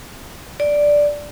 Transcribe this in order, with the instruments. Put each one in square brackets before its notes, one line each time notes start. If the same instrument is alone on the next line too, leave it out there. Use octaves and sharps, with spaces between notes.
[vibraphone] D5